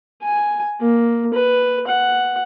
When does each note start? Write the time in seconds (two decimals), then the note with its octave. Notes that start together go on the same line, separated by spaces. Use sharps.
0.23 G#5
0.81 A#3
1.34 B4
1.87 F#5